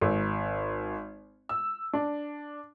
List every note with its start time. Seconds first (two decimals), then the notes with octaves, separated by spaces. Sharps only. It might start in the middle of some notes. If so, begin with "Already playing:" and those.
0.01 G#1
1.49 E6
1.93 D4